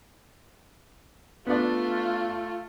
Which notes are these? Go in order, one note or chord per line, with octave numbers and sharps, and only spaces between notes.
A3 B3 D4 F4 D5